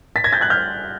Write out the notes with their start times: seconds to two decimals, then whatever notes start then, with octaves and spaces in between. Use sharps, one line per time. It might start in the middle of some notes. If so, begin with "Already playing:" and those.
0.16 A6 B6
0.24 G#6 A#6
0.33 G6 A6
0.41 F#6 G#6
0.50 F6 G6